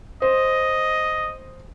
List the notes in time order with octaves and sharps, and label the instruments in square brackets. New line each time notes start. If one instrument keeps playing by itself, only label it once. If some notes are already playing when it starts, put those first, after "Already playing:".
[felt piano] C5 [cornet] D#5